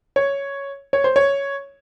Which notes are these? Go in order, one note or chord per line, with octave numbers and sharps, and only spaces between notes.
C#5
C#5
C5
C#5